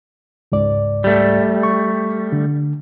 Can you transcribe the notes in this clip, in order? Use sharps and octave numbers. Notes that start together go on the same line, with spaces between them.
C#2 G#2 D5
G3 A3
C#6
D3